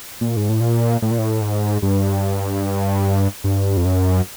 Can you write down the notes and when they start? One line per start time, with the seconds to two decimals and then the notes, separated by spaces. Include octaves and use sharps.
0.21 A#2
0.37 G#2
0.49 A2
0.61 A#2
1.02 A2
1.11 A#2
1.19 A2
1.42 G#2
1.82 G2
3.44 G2
3.77 F2
3.85 F#2